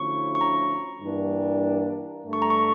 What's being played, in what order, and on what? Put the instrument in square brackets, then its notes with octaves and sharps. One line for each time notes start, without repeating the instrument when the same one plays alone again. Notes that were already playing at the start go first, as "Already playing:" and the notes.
Already playing: [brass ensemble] D2 D3 F3 C#4 E4 [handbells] C#6
[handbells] C#6
A#5
[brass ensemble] G2 E3 G3 A#3 D4
G2 D3 A3
[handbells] C#6
A#5
C#6